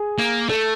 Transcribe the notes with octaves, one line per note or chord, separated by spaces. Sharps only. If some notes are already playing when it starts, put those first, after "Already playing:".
Already playing: G#4
A#3
A3 A4